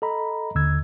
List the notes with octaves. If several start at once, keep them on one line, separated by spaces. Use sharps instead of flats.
A4 D#5 A#5 B5
D#2 D3 E6 G#6